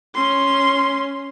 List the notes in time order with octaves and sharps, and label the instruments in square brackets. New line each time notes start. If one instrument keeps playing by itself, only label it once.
[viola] C#4 C6